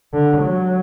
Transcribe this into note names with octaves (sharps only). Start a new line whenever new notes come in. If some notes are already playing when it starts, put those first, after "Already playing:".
D3
F#3